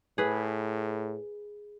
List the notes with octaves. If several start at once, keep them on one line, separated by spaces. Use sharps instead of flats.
A2 G#4 B4